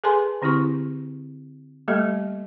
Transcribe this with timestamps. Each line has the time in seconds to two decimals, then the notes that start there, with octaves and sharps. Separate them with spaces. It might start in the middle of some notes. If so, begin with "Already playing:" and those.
0.04 G#4 A4 B4 G#5 A5 C6
0.42 D3 C4 E4 G4 C#6
1.88 G3 A3 A#3 G4 A4 D#5